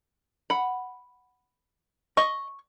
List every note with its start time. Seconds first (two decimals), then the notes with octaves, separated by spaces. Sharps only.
0.50 F#5 B5
2.17 D#5 C#6